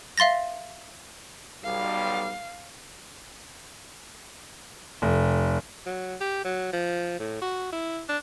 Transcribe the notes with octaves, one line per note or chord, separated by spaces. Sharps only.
E5 F5 C6 A6 A#6
B1 G3 F5
F1
F#3
G4
F#3
F3
A2
F#4
E4
D4